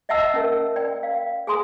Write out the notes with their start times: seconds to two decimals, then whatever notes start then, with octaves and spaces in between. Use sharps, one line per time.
0.09 D#5 E5 F#5 A5 E6
0.34 C#4 A#4
0.76 D5 G5
1.03 F5
1.47 G#4 G#5 C6 D#6